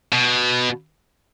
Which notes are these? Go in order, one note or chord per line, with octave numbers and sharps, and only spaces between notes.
B2